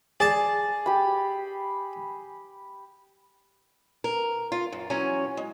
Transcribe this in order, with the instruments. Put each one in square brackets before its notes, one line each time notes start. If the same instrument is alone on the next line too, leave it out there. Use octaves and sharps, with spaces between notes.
[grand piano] G#4 [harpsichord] D5 A5
[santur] G4 B5
[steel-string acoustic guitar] A#4
F4
F#2
E2 F#3 C#4 C#5 G#5
G#3